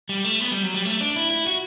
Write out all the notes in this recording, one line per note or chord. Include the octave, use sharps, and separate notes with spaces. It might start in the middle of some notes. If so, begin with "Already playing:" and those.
G3
A3
B3
G3
F#3
G3
A3
D4
E4
E4
F#4